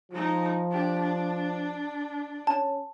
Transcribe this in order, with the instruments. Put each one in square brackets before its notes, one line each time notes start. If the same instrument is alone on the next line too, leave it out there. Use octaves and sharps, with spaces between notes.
[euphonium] F3 [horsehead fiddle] G#3 D#4
[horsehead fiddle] D4 G4
D4
[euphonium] C#4 [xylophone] A5